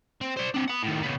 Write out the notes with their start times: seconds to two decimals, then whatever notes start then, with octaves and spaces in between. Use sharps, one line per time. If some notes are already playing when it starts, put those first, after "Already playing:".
0.21 C4
0.37 C5 D5
0.54 C4 D4
0.68 F#5 B5
0.83 A2 D#3
1.03 C#3 B3